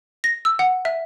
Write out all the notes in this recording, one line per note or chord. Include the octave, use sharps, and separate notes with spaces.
A#6
E6
F#5
E5